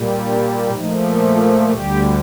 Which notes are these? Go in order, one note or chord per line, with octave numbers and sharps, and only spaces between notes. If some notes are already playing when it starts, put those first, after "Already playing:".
Already playing: A#2 G3
D4
A#2 F3 A3 D#4
F4
D2 D3 G3 G4